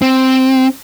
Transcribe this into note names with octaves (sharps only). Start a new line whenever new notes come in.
C4